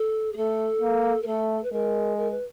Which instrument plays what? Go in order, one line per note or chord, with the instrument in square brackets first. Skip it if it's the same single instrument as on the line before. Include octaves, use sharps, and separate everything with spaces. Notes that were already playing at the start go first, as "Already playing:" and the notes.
Already playing: [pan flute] A4
G#4
[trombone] A3 [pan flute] A4
[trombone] A#3
[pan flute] A#4
[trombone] A3 [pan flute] A4
[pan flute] B4
[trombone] G#3 [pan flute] A#4
[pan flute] A#4
B4